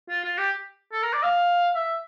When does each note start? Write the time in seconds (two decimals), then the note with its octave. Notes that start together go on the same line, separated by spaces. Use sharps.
0.09 F4
0.24 F4
0.38 G4
0.92 A4
1.02 A#4
1.13 D5
1.23 F5
1.75 E5